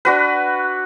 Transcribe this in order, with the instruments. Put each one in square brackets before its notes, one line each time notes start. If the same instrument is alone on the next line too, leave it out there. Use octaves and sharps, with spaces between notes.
[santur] D4 F#4 B4